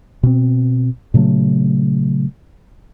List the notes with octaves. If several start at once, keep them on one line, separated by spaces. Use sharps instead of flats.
B2 C4
A#2 C#3 F#3 A3